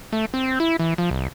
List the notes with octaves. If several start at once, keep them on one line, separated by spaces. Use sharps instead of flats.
A3
C4
E4
E3
F3
C2